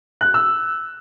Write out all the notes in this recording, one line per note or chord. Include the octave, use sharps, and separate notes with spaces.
F#6
E6